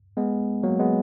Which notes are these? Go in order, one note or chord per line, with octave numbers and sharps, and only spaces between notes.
G#3 B3
F#3 A#3
G#3 B3